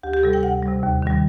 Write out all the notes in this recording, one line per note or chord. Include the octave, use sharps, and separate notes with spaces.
D2 G4
G4
C3 G3 A4
G5
D2 F#5
G3
C3
D#2
D#3 G3